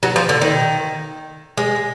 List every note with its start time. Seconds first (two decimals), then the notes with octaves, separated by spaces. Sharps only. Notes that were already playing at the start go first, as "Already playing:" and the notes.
0.03 F#3
0.16 F3
0.29 D3
0.41 D#3
1.57 G#3